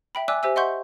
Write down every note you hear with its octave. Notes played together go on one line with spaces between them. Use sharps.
E5 G5 B5
D5 E5 G#5 D6 E6 F#6
G4 C5 E5 G#5 E6
D#5 E5 F#5 C6 C#6 G6